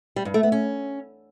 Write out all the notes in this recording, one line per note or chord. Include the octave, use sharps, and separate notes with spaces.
G3
G2
A3
B3
C#4